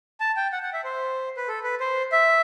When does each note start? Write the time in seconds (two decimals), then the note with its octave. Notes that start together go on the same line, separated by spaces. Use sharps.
0.20 A5
0.36 G5
0.52 F#5
0.62 F#5
0.73 E5
0.84 C5
1.37 B4
1.48 A4
1.64 B4
1.80 C5
2.12 E5